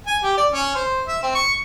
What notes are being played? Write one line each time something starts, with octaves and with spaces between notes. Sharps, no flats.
G#5
G4
D5
C#4
C5
E5
C4
C#6